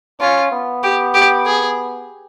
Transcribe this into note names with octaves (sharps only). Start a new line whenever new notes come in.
C#4 F4
B3
G4
G4
G#4